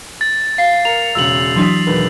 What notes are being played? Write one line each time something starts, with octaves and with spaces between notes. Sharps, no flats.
A6
F5 C7
A#4 A#5 C#7 F7
E1 C#3 E6 F#7
E3 F#3 D4 C6 D#6 B6
E1 D#3 B4